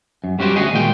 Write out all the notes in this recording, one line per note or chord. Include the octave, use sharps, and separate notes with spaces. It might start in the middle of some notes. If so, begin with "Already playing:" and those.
F#2
G3 C#4 F#4 G4 C5
D2 F#4 G#4 D#5
A#2 D#3 G#3 G5